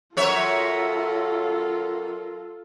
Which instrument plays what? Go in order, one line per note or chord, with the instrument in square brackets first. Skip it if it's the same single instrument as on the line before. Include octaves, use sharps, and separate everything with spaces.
[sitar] F#2 C#5 E5 [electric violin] F4 A4